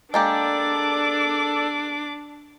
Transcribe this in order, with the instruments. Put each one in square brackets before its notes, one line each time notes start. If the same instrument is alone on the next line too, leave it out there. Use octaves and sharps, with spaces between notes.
[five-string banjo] G#3 A#3 G4 [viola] D4 D6 [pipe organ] A4 D5